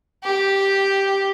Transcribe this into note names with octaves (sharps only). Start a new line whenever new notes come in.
G4